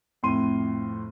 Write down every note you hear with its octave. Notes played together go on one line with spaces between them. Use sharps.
F2 A2 C6 D#7